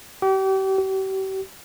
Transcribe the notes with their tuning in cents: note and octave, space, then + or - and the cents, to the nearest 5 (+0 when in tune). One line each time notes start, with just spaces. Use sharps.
G4 -35
G4 -40